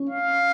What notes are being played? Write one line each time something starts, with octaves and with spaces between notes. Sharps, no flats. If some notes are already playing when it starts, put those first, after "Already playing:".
Already playing: C#4
F5